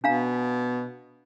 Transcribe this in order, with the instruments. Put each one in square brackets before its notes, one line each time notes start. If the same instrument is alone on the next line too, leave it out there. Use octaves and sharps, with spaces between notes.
[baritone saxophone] B2 [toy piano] D4 F5 A#5